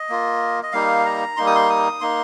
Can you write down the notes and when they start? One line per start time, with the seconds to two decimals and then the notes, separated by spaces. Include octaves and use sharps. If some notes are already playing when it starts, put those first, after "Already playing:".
Already playing: D#5
0.10 A#3 F4
0.63 D#5
0.73 G3 A#3 D#4 F5
1.05 A#5
1.37 G3 A#3 D#4 C6
1.47 D#6
1.55 C6
1.70 D#6
2.01 A#3 D#4 C6